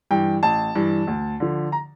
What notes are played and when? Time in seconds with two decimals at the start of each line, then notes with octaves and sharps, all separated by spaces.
0.11 G2 E3 G5
0.43 A1 A5
0.75 G2 E3
1.07 D2
1.40 D3 F3
1.72 A#5